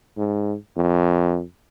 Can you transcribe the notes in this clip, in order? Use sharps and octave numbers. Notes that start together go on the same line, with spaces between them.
G#2
F2